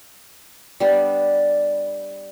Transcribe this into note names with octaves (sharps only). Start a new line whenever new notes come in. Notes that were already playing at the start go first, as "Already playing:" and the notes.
G3 B3 D4